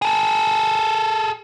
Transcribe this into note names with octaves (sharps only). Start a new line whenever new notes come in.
G#4 A4